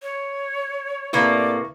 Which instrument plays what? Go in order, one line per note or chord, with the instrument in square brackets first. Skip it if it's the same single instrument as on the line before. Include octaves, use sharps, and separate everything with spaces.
[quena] C#5
[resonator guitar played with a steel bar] A2 C3 A#3 [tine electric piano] E4 B4 C#6 [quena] D5